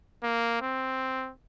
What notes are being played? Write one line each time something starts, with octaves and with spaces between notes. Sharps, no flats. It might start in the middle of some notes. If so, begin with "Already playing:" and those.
A#3
C4